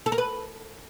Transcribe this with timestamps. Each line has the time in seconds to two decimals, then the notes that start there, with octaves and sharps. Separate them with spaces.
0.06 A4
0.12 A#4
0.18 B4